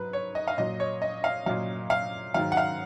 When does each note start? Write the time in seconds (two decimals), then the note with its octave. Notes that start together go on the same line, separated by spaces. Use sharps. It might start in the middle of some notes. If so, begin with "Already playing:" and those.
Already playing: G#2 F#3 B4
0.13 C#5
0.35 D#5
0.48 F5
0.58 A#2 F#3 D#5
0.80 C#5
1.02 D#5
1.24 F5
1.46 A#2 F#3 F5
1.90 F5
2.34 G#2 D#3 F#3 F5
2.52 F#5
2.57 F5